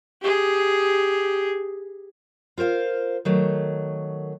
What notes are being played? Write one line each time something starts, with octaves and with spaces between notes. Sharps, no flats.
G4 G#4
F4 A#4 C5 F5
D#3 F#3 A3